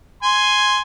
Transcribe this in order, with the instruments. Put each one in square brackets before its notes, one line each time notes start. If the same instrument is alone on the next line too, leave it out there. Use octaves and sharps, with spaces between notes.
[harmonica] G#5 C6